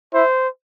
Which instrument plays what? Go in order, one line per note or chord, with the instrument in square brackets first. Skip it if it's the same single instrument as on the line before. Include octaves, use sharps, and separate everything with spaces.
[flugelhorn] E4 [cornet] C5